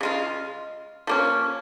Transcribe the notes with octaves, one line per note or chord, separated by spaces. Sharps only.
C#3 G#3 F4
F3 A#3 C#4